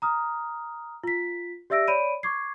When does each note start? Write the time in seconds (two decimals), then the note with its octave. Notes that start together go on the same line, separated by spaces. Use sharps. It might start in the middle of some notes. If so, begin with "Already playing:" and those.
0.02 A#5 D#6 F6
1.04 F4 B6
1.70 G4 D5 E5 E6 A#6 D7
1.88 C#5 D5 B5 D7 D#7
2.23 C#6 D6 G#6 C7